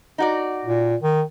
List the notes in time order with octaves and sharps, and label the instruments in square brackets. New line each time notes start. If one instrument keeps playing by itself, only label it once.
[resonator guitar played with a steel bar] D#4 F#4 D5
[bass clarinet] A#2
D#3